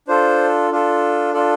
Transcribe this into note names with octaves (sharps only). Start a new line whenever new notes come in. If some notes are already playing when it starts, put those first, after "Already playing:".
D4 F4 A4 C5
D4 F4 A4
D4 F4 A4 D5